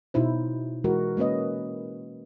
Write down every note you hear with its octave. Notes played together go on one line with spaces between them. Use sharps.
B2 D#4 E4 C5
E3 G#3 F#4 A#4
G#3 A#3 C#4 B4 D#5